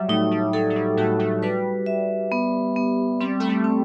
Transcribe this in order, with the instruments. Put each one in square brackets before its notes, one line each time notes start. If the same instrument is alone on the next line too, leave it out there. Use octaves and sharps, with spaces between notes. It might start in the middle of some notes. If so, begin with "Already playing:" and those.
Already playing: [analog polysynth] F#3 G3 [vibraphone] E5
[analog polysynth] A2 A3 [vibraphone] D#4
[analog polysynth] G3
[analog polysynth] F#3 [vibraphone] A4
[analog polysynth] F#3
G3
[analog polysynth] A2 A3 [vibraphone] F#4
[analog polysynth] A2 A3
[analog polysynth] G3 [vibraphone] B4
[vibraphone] E5
B3
B3
[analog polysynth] G3 [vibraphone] C4
[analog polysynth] A3
G3
[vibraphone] C4